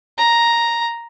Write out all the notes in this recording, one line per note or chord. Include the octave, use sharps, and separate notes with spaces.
A#5